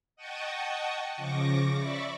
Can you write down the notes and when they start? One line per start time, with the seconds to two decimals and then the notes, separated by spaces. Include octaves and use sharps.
0.16 D#5 F#5 G5 A5 C#6 D#6
1.16 C#3 F3 C#6 D6 A#6
1.75 D5 E5 B5 C#6 D6